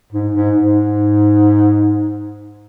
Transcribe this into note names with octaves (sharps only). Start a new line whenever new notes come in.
G#2
G#2
G#2